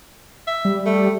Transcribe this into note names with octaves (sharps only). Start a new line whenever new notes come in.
E5
G3
A3